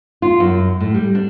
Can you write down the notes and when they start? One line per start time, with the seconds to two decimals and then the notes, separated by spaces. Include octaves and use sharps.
0.22 F4
0.40 F#2
0.80 A2
0.94 G3
1.15 D4